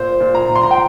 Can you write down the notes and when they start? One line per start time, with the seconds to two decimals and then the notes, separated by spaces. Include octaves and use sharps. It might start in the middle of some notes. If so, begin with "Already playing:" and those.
Already playing: A#2 C5
0.21 A#2
0.35 A#5
0.49 A#2
0.55 C6
0.63 A#5
0.71 G5